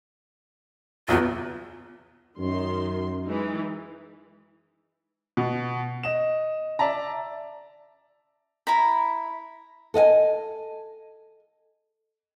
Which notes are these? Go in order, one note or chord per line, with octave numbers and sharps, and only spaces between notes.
B1 E2 F4
F#2 D#3 C6
E3 G#3 D#4
B2
D#5 E7
D5 E5 A5 A#5
E4 A#5 B5
A4 D#5 F5 G#5